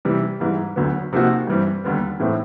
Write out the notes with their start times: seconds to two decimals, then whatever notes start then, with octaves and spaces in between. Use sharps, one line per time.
0.05 C3 E3 G3
0.40 G#2 E3 G3
0.76 D2 D3 F#3 B3
1.13 C3 F3 A#3 D#4 F#4
1.47 G2 E3 G3 C4
1.84 D#2 D3 G3 B3
2.20 A2 E3 A3 C4 E4